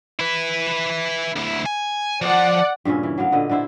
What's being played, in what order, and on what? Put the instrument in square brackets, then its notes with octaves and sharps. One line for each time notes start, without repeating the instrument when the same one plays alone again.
[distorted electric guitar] E4 B4
D2 E4
G#5
[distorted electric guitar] F3 [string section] D5 F#5
[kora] G2 A#2 C#3 C#4
E3
F#3 A#3 B3 F5
A#2 D3 B4 D#5
D3 D4 E4 C5